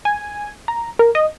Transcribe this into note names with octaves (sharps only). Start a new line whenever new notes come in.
G#5
A#5
A#4
D#5